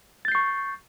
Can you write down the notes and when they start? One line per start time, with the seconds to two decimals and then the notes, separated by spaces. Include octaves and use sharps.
0.25 A6
0.28 G6
0.32 C7
0.35 C#6